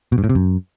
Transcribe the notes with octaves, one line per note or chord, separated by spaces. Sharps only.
B2
G2
A2
C3
F#2